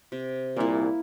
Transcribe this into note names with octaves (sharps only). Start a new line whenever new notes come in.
C3
C2 A#2 A#3 E4